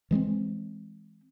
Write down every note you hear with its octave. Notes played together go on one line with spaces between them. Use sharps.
E3 G#3 A#3 C4